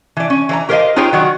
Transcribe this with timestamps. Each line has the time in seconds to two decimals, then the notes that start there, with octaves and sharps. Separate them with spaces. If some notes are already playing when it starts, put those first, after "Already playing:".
0.17 E3 D5
0.30 C#4
0.49 E3 C#5 A#5
0.69 G4 A#4 C5 C#5 D#5 F5
0.96 D#4 F4 G#4 C5 C#5 G5
1.13 D#3 F#3 F#4 D5